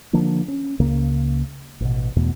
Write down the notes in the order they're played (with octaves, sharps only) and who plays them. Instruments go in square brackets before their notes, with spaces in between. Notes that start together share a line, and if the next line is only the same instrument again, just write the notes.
[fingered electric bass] D3 F3 A#3 D4
C#4
C#2 C#3 A#3
A1 B2
E2 B2 A3 B3